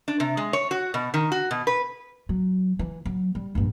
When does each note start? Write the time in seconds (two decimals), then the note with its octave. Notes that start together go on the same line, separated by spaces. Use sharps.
0.08 D4
0.20 C3
0.37 G#3
0.53 C#5
0.71 F#4
0.94 B2
1.14 D#3
1.32 F#4
1.51 B2
1.67 B4
2.29 F#3
2.79 E3
3.05 F#3
3.35 G3
3.55 A#1 G2